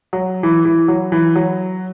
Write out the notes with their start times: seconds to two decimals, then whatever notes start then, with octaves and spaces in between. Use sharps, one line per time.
0.13 F#3
0.43 E3
0.65 E3
0.88 F#3
1.12 E3
1.35 F#3